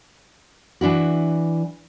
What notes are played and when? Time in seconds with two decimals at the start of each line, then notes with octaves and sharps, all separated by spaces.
0.81 E3 D4 E4 F#4